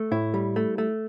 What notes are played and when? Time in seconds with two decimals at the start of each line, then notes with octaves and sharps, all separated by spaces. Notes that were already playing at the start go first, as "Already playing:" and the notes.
Already playing: A3
0.11 A2 E4
0.34 G3
0.56 A3
0.78 A3